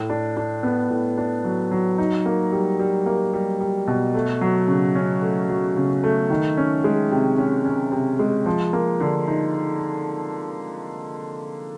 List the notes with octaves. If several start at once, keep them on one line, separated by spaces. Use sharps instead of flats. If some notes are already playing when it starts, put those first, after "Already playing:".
Already playing: A2
D4
D4
B3
A2
D4
F#3
F#3
D#4
A#3
G3
G3
A#3
G3
G3
B2
A3
F#3
C#3
C#4
A3
F#3
C#3
A3
D#3
C#4
G#3
C3
C#4
C#4
C3
G#3
F3
A#3
D3
D#4